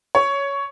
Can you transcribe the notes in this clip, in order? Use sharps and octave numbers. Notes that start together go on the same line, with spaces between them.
C#5